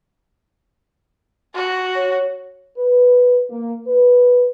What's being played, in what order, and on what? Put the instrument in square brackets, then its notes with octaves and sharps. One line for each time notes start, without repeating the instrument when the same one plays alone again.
[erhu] F#4
[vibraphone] C#5
[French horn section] B4
A#3
B4